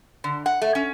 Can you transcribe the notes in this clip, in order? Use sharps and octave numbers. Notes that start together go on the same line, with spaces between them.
D3
F#5
A3
C#4